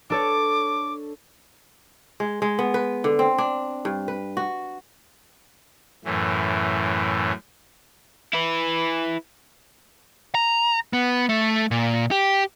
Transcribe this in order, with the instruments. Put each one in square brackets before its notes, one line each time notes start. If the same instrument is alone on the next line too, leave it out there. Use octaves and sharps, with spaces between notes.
[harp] D4 A4 C#5 [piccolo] D6
[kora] G#3
G#3
B3
B4
D3
C4
D4
G2
B4
F#4
[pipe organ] F#2 A2 E3
[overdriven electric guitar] E4 B4
[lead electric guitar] A#5
B3
A3
A#2
G4